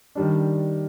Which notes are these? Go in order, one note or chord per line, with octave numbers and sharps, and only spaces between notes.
D#3 G3 D4